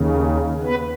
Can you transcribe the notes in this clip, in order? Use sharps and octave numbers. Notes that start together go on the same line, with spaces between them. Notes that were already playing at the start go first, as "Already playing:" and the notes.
Already playing: D#2 C#3
B3 B4